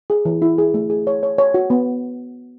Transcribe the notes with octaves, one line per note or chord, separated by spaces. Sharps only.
G#4
E3
E4
G#4
A3
G#4
C#5
C#5
C#5
F#4
B3